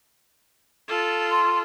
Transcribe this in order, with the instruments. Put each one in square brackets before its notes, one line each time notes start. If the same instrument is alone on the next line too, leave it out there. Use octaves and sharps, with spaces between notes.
[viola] F4 A4
[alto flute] C6